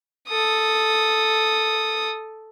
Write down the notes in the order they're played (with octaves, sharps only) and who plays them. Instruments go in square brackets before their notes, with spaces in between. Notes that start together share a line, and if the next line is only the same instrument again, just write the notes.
[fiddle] A4 D#6